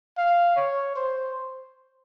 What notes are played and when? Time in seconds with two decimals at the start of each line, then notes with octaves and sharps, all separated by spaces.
0.17 F5
0.56 C#5
0.96 C5